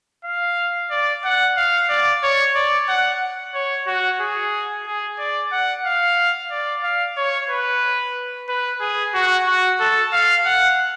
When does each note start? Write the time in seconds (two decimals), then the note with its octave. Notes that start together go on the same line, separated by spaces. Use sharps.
0.25 F5
0.90 D5
1.24 F#5
1.57 F5
1.89 D5
2.23 C#5
2.55 D5
2.89 F#5
3.54 C#5
3.87 F#4
4.21 G#4
4.86 G#4
5.19 D5
5.52 F#5
5.85 F5
6.51 D5
6.83 F5
7.17 C#5
7.49 B4
8.49 B4
8.81 G#4
9.14 F#4
9.47 F#4
9.80 A4
10.13 F5
10.46 F#5